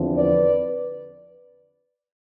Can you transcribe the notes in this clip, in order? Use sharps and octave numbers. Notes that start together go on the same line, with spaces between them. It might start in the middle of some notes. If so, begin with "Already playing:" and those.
Already playing: E2 D3 F3 C4
B4 D5